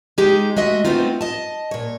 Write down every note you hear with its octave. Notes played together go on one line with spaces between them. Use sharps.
G#3 D#4 G4 G#4
G#3 A3 F#4 D#5 E5
A3 B3 C4 D#4 F4
D#5 A5
A#2 C#5